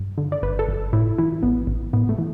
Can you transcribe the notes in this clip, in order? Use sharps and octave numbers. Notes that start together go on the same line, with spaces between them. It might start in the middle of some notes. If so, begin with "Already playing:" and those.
Already playing: G2
D3
D5
G1 B4
A4
G1
A2 E4
E3 E4
A1 B3
A1
A2 B3
A3
E3